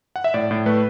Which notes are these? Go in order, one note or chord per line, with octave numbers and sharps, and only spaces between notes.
F#5
E5
A2 D5
A2
A3 B4